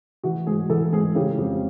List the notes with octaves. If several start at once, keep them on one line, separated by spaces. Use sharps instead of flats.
E3 F#4
G#2 G#4
E3 A4
G#2 G#4
C#3 G4
F2